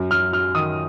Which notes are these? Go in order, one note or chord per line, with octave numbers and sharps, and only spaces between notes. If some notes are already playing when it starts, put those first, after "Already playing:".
Already playing: F#2
F#2 F6
F#3 F6
D#3 D#6